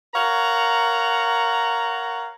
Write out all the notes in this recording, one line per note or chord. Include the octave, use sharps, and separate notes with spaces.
A#4 C#5 F5 F#5 A#5